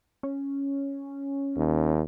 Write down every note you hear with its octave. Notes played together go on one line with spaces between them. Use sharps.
C#4
D#2